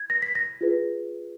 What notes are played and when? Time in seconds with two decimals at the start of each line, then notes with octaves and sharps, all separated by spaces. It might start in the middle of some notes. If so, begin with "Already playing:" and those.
Already playing: G#6
0.10 A#6
0.22 B6
0.35 A#6
0.61 F4 G#4 B4